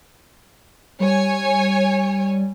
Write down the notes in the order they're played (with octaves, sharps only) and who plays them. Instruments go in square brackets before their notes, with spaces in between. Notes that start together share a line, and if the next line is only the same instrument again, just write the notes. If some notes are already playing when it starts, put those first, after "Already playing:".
[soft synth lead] G3 [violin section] C#5 G#5